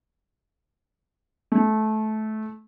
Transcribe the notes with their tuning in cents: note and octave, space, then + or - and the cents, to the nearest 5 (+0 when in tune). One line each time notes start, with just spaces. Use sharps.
A3 -20